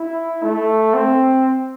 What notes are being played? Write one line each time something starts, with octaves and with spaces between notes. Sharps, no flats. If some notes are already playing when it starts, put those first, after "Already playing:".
Already playing: E4
A3
C4